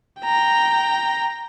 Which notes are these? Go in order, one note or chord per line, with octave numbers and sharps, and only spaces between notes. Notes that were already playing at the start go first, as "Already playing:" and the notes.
G5 A#5